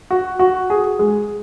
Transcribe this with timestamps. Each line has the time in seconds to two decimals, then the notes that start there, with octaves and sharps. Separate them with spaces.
0.11 F#4
0.39 F#4
0.70 G#4
0.99 G#3